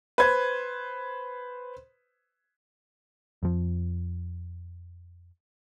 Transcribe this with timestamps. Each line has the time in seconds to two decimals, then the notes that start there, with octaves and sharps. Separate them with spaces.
0.18 B4 C5 G#6
3.43 F2 F3